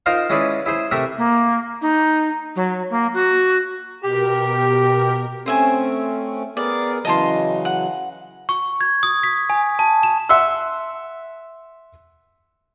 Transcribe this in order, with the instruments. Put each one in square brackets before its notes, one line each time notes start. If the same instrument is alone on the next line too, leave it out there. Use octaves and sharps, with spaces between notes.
[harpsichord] D#4 F4 A#4 C5 F5
G#3 C#4 E4 G#4 B4 D5
E4 G#4 C5
C3 A3 A#4 E5
[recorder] A#3
D#4
F#3
A#3
F#4
[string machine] B2 A#4 [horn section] G4
[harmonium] A3 C4 C#4 [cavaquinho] C5 E5 G#5
[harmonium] B3 G#4 A#4 [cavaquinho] D5
[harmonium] C#3 E3 F#3 [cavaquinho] D#5 A5 C6
[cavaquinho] F#5
[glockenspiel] C#6
G#6
D#6
B6
G#5
A5
E7
[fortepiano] E5 F#5 C6 E6